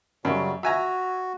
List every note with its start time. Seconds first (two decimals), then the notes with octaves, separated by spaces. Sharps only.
0.25 F#2 C#3 F#3 G3
0.63 F#4 E5 G#5 A#5